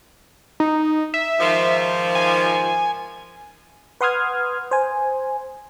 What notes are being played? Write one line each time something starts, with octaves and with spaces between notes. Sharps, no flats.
D#4
E5
G#2 D#3 F3
G#5
B4 F#5 C6 D#6 F6 G#6
C5 G#5